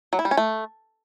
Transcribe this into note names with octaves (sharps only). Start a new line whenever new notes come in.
F#3
E4
G3
C#4
A3